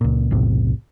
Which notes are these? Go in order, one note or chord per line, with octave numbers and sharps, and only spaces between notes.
C#2 A#2
B1 E2 A2 C3